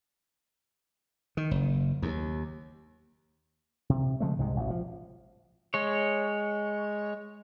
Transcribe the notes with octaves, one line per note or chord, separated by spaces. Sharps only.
D#3
F#1
D#2
C3
C#3 F3 G#3 A3
C2 G#2 C3 G#3
A1 B2
F3
G#3 C#5